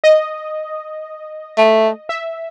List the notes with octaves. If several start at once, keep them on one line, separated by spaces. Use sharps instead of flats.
D#5
A3
E5